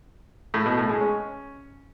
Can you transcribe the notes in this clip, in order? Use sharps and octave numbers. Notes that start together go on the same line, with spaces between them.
A2
B2
A2
G#3
C#4